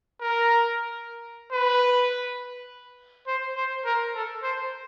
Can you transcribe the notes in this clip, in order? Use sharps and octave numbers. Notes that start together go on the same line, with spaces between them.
A#4
B4
C5
C5
A#4
A4
C5